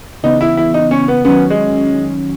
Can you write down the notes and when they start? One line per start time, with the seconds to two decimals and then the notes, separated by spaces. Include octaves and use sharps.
0.23 C#3 E3 B3 D#4
0.41 E4
0.57 E4
0.74 D#4
0.91 C#4
1.08 B3
1.25 D#3 F#3 B3 C#4
1.50 G#3